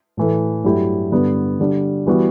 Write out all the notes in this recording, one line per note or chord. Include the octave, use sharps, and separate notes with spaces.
A2 E3 A3
G2 F#3 A3 E4 G4
G2 D3 G3 B3
D3 G3 D4
E3 G3 B3 F#4